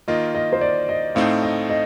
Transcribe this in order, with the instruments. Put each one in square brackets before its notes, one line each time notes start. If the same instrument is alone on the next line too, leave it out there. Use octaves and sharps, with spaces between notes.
[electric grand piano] D#3 A#3 F4 [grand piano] D#5
[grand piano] D#5
C5
D5
D#5
[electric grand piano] A2 A3 C4 D#4 [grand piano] F5
[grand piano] D#5
D#5